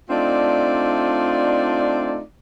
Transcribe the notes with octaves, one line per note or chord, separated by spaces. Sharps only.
A3 C4 D4 D#4 F4 D5